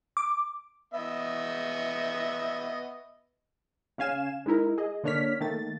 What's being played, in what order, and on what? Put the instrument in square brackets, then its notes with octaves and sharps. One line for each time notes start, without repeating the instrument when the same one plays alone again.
[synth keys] D6
[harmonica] B3 D#5 E5
[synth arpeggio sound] C#3 C#4 F5 G#5 E7
G#3 D#4 E4 A#4
G#4 D#5
D3 A#3 D4 C#5 F6 B6
D#3 A3 A#3 A6